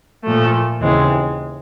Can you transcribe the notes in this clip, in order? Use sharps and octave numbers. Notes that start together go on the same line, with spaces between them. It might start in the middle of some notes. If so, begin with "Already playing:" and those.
A#2 F3 A3
D#2 C#3 E3 G#3 C4